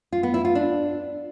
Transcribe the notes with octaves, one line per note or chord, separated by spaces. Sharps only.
F4
B3
E4
F4
D4